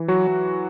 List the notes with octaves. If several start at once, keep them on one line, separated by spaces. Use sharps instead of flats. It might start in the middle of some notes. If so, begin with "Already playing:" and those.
Already playing: E3
F#3 F#4
F#3